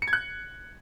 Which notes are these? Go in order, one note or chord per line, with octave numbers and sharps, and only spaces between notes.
C#7
G#6
F#6